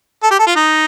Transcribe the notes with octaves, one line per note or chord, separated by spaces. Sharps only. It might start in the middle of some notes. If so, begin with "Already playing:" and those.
A4
G4
A4
F4
D#4